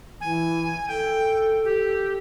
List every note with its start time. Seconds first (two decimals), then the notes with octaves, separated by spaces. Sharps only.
0.21 E3 G#5
0.88 A4 G5
1.64 G4